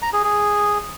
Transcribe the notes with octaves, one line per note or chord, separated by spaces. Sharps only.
A#5
G#4
G#4